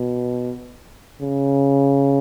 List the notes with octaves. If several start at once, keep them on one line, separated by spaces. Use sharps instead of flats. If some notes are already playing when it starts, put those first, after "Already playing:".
Already playing: B2
C#3